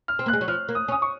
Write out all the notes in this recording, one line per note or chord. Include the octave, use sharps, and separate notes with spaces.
F6
C4
A#3 F#6
G#3
F#3
F3 F6
A#3
D#6
C#4
D#6
C#6